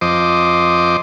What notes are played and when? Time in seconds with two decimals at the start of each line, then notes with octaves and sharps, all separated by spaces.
0.01 F2 C5 D#5 D6